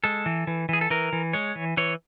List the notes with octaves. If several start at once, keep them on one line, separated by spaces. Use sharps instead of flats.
G#3 A4
E3
E3
E3 G#4
A4
E3 A#4
E3
G#3 C#5
E3
E3 C#5